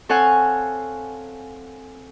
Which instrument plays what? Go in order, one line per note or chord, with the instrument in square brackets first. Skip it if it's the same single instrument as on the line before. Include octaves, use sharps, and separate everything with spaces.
[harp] C4 A4 C#5 F5 F#5 G#5